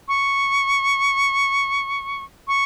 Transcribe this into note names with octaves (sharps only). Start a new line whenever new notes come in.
C#6
C#6